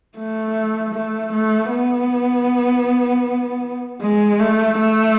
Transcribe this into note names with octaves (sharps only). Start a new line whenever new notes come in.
A3
A3
A3
B3
G#3
A3
A3